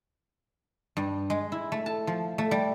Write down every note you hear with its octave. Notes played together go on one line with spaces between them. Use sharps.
G2
G#3
E4
A3
A5
F3
A3
G3